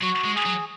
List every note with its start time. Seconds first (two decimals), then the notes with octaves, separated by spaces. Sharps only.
0.01 F#3 F#4
0.24 G#3
0.35 G#4
0.46 F#3